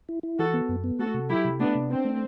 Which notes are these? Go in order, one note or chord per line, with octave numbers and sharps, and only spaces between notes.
E4
E4
E3 F#4 A4
B3
F#2
B3
A3 F#4 A4
C3
F#3 E4 G4
C3
A3 B3 D4
C3
C4 D4
A3